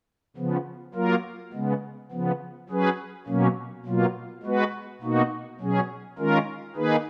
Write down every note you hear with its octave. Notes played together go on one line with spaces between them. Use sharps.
C#3 F3 B3
F#3 A#3 F4 A#4
C#3 G#3 B3
C#3 F3 B3
F#3 C#4 G#4 B4
B2 F#3 A#3 C#4
B2 F#3 A#3 F4
G#3 B3 F#4 B4
B2 A#3 D#4 F#4
B2 F#3 C#4 G#4
D#3 G#3 C#4 F4 A#4
D#3 A#3 D#4 G#4 B4